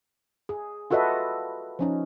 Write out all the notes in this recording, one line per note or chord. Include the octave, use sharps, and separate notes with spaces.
G#4
F4 F#4 A4 B4 D#5 E5
F3 C#4 D#4